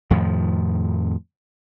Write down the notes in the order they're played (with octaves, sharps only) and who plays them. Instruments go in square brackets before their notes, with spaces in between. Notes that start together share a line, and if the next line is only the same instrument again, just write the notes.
[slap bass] F2 A2 D#3 F3